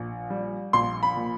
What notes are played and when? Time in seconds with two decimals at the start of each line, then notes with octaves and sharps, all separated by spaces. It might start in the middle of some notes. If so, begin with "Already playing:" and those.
Already playing: A#1
0.30 G3
0.73 A#1 C6
1.03 B5
1.17 A#2